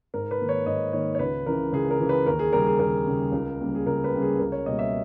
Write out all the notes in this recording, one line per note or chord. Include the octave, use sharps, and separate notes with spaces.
G#2 A#4
B4
D#3 A#3
C#5
G#2 D#5
D#3 A#3 C#5
C#5
C#2 B4
C#3 E3 A#4
C#2 G#4
A#4
C#3 E3
B4
D#2 A#4
G#4
C#3 G3 A#4
G#4
D#2 A#4
C#3 G3
C#2
C#3 G3 A#3
G#4
C#2 A#4
B4
C#3 G3 A#3
G#4
C#2 A#4
C#5
B2 G3 A#3 D#5
E5